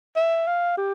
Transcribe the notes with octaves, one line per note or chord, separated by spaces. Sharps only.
E5
F5
G4